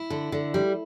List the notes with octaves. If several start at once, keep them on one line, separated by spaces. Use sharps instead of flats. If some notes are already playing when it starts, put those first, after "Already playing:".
Already playing: E4
D3
D3
G3